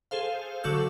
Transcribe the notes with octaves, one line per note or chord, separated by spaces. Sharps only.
G#4 A4 C5 F5
D3 F#3 F#4 A4 E6 G6